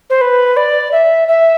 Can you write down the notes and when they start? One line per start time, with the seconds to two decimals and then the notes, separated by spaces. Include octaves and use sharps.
0.10 C5
0.21 B4
0.57 D5
0.92 E5
1.28 E5